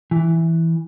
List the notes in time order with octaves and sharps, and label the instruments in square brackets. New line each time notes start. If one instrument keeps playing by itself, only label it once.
[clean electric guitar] E3